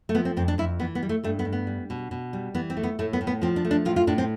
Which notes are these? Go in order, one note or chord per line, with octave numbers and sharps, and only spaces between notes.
A3
F3 B3
C4
F2 C4
D4
F2 E4
E3 B3
B3
G3
A3
G2 A3
B3
G2
B3
G3
B2
B2
G3
E3 B3
C4
A3
B3
A2 A3
B3
A2
B3
F3 C4
D4
A3
D4
A2 F4
F4
A2 D4
C4